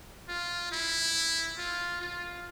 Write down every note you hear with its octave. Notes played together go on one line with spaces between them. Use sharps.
F4
E4
F4
F4